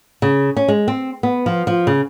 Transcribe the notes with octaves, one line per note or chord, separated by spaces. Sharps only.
C#3
C#4
G#3
C4
B3
F3
F3
C#3